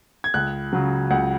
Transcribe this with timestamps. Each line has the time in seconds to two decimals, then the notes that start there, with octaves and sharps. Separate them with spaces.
0.24 G#6
0.34 C#2 F#6
0.73 C#3 F#3
1.10 C#2 F#5